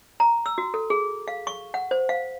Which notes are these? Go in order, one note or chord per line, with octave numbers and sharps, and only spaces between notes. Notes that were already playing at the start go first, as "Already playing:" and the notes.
A#5
E6
F#4
A4
G#4
F5
C#6
F#5
C5
F5